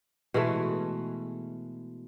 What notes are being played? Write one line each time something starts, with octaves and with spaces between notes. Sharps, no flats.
B2 E3 G#3 A3